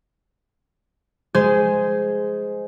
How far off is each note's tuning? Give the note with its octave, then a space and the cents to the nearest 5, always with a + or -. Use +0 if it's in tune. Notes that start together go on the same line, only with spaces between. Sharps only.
G#3 +0 G#4 +0 C5 -15